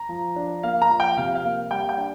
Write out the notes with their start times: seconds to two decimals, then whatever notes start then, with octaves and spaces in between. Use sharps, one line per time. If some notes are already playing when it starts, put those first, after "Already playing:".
Already playing: A#5
0.09 F3
0.36 D4
0.63 A#3 F5
0.82 A#5
0.89 F3
1.00 G5
1.17 C3 F5
1.35 F5
1.44 A#3
1.71 G3 G5
1.89 G5
1.98 D4